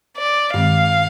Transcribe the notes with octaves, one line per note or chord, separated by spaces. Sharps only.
D5
G2 D#3 G#3 C4 F5